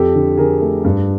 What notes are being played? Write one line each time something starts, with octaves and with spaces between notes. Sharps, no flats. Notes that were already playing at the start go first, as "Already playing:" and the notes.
Already playing: F2 G4 A4
D3
D3 G#4 A#4
A3
G2